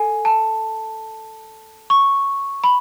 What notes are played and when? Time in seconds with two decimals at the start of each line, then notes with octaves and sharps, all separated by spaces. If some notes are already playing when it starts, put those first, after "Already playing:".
Already playing: A4 G#5
0.25 A5
1.90 C#6
2.64 B5